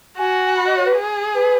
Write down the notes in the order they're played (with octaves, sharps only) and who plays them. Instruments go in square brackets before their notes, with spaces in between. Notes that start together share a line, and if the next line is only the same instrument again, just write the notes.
[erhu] F#4 [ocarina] G#5
[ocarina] B5
D#5
C#5
B4
[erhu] G#4
[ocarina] B4